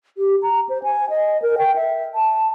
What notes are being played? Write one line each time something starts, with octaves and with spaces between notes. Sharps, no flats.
G4
A#5
C5
G#5
D#5
A#4
G5
E5
A5